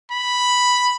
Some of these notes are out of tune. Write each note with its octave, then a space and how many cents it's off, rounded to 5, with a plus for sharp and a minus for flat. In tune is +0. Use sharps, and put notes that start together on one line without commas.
B5 +0